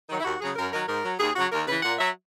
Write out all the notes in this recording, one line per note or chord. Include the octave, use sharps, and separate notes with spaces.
D#3 F#3
E4
D#2 F#4
C#3 F#3 G#4
F#2 A#4
D#3 F#3 A#4
G#2 A#4
F#3
D#2 G#4
C#3 F#3 F#4
D#2 A#4
C#3 E3 B4
A#2 F#5
F#3 E5